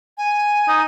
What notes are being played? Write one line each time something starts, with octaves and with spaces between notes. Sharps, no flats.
G#5
D#4